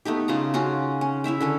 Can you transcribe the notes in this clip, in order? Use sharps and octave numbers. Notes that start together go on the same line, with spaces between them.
A3 B3 D#4 G4
C#3 F4 A#5
C#4 F4 F#4 A#5
C#4
E4 C#5 E5 G5
D3 C#4 A4